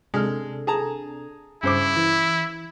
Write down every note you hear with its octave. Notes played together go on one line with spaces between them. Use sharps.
C3 G#3 D4 A4 F6
G#4 A5 A#5
G2 C#3 E4 C5 D6
E3